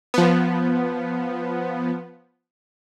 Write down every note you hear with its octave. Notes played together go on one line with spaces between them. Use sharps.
F3 B3